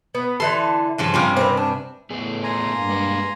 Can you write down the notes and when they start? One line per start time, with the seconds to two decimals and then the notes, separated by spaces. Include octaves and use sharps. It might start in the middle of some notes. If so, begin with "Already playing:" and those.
0.15 B3
0.40 D3 E3 A4 C6
0.98 G2 C#3 F3
1.14 C3 G3 C#4 F4 F5
1.37 C4 A#4 B4
1.57 D4
2.10 A2 A3 B3 G#4
2.44 G#5 A#5 C6
2.72 G2 A#3
2.89 G#3 B4 F5